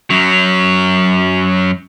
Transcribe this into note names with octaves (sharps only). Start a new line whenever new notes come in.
F#2 F#3